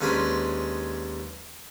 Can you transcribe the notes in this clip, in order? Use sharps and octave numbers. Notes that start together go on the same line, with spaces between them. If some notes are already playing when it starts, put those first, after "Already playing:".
D#2 G#3 C#4 D4 B4 C5